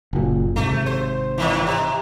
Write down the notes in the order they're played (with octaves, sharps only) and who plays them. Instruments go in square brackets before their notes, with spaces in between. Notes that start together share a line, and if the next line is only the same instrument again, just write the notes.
[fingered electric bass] F#1 A#2
[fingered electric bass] G#1 G#2 C3 [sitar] A3
[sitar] C5
A2 D#3 E3
C3